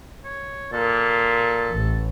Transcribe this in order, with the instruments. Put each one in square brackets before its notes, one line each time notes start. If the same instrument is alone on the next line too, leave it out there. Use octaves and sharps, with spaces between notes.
[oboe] C#5
[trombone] A#2 [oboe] A4
[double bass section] A1